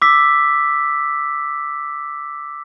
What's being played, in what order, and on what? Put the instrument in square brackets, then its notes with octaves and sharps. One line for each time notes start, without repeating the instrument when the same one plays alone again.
[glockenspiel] D6 E6 B6